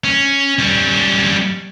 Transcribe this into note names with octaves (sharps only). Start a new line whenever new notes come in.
C#4
G3 C#4